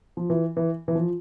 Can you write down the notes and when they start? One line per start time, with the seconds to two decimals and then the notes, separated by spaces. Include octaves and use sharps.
0.17 F3
0.30 E3
0.57 E3
0.88 E3
0.95 F3